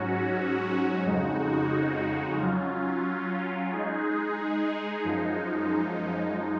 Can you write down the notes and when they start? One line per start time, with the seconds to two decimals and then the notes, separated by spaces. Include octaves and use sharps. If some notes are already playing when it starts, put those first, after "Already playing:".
Already playing: G#2 F#3 C#4 F#4
1.05 F2 C#3 G#3 D#4 F#4
2.39 F#3 C#4 F4
3.72 G#3 D#4 G#4
5.05 F#2 F3 G#3 D#4